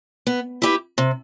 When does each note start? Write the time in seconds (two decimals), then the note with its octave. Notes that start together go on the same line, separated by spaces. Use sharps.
0.27 B3
0.62 E4 G4 B4 E5
0.98 C3